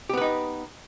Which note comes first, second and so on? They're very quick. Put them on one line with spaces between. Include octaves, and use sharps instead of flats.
G4 B3 B4 D#4